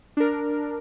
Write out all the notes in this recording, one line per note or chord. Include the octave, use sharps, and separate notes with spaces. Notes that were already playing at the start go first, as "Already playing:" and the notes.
D4 A#4